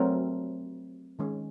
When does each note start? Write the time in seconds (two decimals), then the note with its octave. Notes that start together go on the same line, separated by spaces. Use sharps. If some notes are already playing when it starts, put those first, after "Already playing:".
Already playing: F#3 A3 C4 A#4
1.19 D#3 G#3 C#4